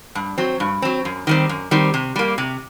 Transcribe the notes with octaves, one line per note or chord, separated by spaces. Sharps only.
G2
F#3 C4
G2
F#3 C4
F#2
D#3 G3 C4
F#2
D#3 G3 C4
C3
G3 A#3
C3